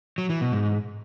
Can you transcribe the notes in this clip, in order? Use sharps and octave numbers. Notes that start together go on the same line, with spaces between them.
F#3
E3
B2
G#2